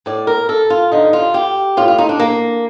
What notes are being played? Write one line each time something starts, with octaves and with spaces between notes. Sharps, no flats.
A2 D5
A#4
A4
F4
G2 D3 D#4
F4
G4
A2 F4
F4
D#4
D4
A#3